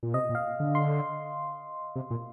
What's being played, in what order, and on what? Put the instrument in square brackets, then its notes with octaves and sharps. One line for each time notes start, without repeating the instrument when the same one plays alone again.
[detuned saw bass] A#2
[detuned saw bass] C3 [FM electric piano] D#5
[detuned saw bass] A#2
[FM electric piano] F5
[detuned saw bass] D3
[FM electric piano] C6
[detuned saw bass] C3
A#2